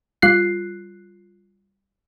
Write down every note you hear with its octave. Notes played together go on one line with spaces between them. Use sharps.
G3 F4 F#6 C7